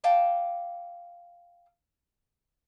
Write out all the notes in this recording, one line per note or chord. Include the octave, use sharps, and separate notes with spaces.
F5 G5 A5 D6